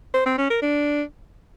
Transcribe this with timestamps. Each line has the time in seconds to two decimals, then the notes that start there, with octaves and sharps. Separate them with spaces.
0.14 C5
0.26 C4
0.38 C#4
0.50 A#4
0.62 D4